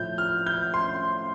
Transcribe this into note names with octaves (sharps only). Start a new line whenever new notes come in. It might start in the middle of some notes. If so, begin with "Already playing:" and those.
Already playing: A2 F3 G6
F6
G6
C6